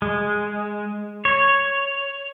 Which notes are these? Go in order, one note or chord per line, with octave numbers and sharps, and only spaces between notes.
G#3
C#5